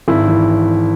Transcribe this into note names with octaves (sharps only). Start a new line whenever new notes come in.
G#1 E4
E3